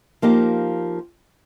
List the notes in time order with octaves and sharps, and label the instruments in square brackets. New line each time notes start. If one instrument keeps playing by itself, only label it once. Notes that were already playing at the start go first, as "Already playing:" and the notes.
[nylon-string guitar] F3 A#3 D#4 G4